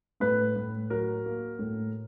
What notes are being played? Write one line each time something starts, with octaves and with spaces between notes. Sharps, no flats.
A2 B4
A2
F#3 A#4
A#3
A2